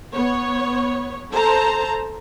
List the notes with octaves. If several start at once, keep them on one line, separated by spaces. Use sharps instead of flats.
B3 C#5
A4 C5 A5 A#5